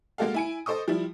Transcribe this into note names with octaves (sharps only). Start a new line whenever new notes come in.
G#3 A#3 F#4 A4 F5
E4 G#5 D7
A4 C5 D#5 C#6 D#6
F3 G3 E4